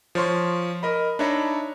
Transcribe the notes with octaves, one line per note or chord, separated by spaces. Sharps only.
F3 C#5 C6 C#6
A#4 D#5 B5
D4 D#4 C#5 E5 A#5 B5